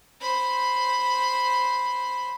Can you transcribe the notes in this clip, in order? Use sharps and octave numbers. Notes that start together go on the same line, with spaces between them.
C5 B5